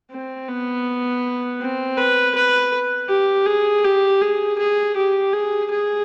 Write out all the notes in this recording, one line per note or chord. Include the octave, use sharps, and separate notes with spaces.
C4
B3
C4
B4
B4
G4
G#4
G4
G#4
G#4
G4
G#4
G#4